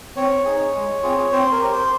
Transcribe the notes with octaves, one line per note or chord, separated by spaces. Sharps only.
C4 C#5
D#4 G#4
G#3
C4 F4 G#4
C4 C5
A#4
G4
C5